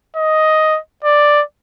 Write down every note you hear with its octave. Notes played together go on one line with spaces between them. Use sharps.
D#5
D5